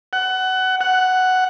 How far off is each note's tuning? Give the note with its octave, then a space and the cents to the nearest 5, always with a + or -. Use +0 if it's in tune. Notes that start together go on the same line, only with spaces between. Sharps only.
F#5 +20
F#5 +5